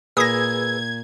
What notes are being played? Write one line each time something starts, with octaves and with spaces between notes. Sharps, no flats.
A#2 G#4 B4 D#6 E6 G#6 A#6